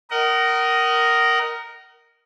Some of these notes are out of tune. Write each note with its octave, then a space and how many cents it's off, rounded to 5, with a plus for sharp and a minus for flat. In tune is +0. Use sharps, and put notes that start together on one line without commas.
A#4 +0 D#5 +0 F#5 +40